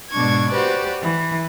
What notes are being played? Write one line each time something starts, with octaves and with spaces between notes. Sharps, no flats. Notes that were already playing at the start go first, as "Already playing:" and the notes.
G#2 B2 D4 C#6 G#6
F#4 G4 B4 C5 D5
E3